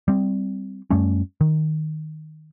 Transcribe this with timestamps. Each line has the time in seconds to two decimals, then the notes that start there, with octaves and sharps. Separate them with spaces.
0.08 G3 C4
0.91 F#2 G3 A3 C#4
1.41 D#3